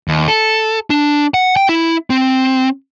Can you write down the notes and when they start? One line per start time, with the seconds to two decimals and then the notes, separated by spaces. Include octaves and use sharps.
0.08 D#2
0.28 A4
0.90 D4
1.34 F#5
1.57 G5
1.69 E4
2.10 C4